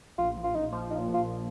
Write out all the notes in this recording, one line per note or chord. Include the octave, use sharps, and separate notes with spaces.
A#1 F4
A#1
F4
A#1 D#4
F3
A#2 D#4
A#1
F4